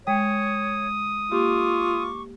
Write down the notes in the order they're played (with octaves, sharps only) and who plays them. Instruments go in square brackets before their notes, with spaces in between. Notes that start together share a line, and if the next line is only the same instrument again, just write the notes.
[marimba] G#3 G5 [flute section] C#5 [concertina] D#6
[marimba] A#3 G4 [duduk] F4 [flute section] C#6 D6